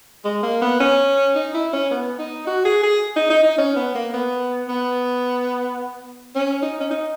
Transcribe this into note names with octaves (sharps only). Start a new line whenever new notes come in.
G#3
A#3
B3
C#4
D#4
E4
C#4
B3
D#4
F#4
G#4
G#4
D#4
D#4
D#4
C#4
B3
A#3
B3
B3
C#4
D#4
C#4
D#4